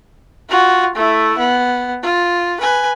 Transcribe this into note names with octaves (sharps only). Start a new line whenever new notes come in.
F4 F#4
A3 E4
B3
F4
B4 G#5